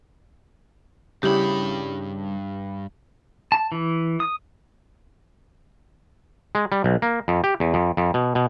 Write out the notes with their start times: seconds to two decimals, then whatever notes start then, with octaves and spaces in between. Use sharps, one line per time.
1.23 G2 C#3 G3 E4 G4 B5
3.52 A5
3.72 E3
4.20 D#6
6.55 G#3
6.72 G3
6.84 B1
7.02 A#3
7.28 F2
7.44 G4
7.60 E2
7.74 F2
7.97 F2
8.14 B2
8.35 B2